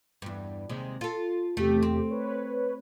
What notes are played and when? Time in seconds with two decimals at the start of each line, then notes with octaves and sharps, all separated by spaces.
0.22 E2 G2
0.69 D#2 C3 G#3
1.01 F4 A4
1.57 E2 C3 A3 G4
1.83 C4
2.10 B4 C#5